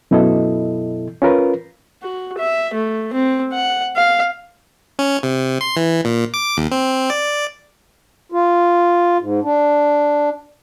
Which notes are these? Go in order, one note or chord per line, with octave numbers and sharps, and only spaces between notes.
F#2 B2 E4 A4 D#5
C#4 F4 A#4 B4
F#4
E5
A3
C4
F#5
F5
C#4
C3
C6
E3
A#2
D6
D#2
C4
D5
F4
G#2
D4